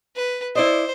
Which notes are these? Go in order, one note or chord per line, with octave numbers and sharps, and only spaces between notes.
B4
E4 C5 D5 D#5